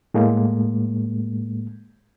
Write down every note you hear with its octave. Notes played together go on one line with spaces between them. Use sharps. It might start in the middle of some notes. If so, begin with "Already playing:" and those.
A2 G#3 A#3